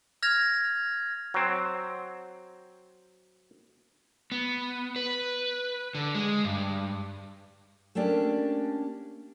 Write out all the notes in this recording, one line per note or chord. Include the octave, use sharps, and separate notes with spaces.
F6 G#6 A#6 F7
F#3 C4
B3
B4
D3
G#3
G2
A3 A#3 C#4 D4 G4